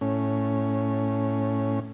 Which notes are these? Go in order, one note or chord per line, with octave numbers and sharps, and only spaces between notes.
A2 C#4